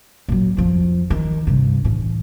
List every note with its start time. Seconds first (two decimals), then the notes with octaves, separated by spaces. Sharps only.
0.28 A#2 F#3
0.57 F2 F3
1.10 D#3
1.47 G2 C3
1.85 A2 E3